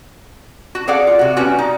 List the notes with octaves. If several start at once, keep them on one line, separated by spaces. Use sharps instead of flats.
F#4
G#4 A4 D5 F5 F#5
F4
C3 F#4
G3 B3 C#4 F#4 G#5
D#4